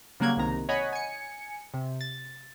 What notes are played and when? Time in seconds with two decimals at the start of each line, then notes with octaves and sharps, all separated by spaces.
0.20 C#3 F#3 G3 A#3 F#6 G#6
0.37 C2 C3 D#3 A#5
0.69 C#5 D#5 F#5 G#5 B5
0.93 G#5 C#7
1.74 C3
2.01 A6